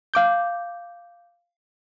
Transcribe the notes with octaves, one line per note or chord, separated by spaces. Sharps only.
F5 D6 G6